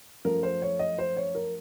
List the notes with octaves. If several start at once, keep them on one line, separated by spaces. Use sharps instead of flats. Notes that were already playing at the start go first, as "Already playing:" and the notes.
F#2 F3 A3 A#4
C5
C#5
D#5
C5
C#5
A#4